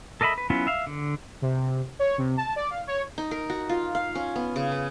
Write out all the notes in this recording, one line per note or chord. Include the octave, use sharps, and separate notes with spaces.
A4 A#4 D#5 E5 B5
B4
F#3 B3 C#4 E4 F4
E5 F5
D3
C3
C#5
C3
A5
D5
F5
C#5
D#4
A#4
F#4
F4
F5
C#4
B3
C#3
B4